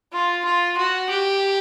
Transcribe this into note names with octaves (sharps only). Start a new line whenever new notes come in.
F4
F4
F#4
G4